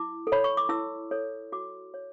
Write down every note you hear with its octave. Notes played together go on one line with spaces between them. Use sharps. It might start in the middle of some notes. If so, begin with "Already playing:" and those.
Already playing: E4 D6
A4
C#5 B5
C#6
D6
E4 E6
A4 C#5
F#4 D6
C#5